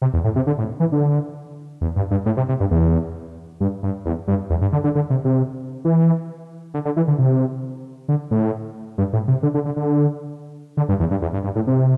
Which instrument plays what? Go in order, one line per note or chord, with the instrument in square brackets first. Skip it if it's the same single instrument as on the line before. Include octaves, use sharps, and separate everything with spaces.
[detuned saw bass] C3
E2
A2
C3
D3
A2
E3
D3
E2
G2
G2
A2
C3
C3
G2
E2
G2
G2
E2
G2
E2
G2
D3
D3
D3
C3
C3
E3
D3
D3
E3
D3
C3
D3
A2
G2
A2
C3
D3
D3
D3
D3
D3
G2
E2
G2
E2
G2
G2
A2
C3